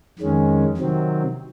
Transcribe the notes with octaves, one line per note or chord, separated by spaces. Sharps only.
F2 D#3 G#3 C#4
C3 D#3 F#3 C4